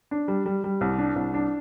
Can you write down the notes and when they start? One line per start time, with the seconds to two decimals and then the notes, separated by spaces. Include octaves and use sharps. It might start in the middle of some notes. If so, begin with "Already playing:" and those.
0.11 D4
0.28 G3
0.46 G3
0.64 G3
0.81 C2
0.98 D4
1.16 C2
1.34 D4